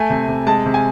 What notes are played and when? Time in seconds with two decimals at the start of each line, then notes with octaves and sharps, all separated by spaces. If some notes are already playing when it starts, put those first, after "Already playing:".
Already playing: A3 G#5
0.10 C3
0.28 C3
0.47 G#3 A5
0.66 C3
0.74 G#5